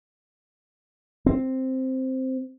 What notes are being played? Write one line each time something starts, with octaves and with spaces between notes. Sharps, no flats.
C4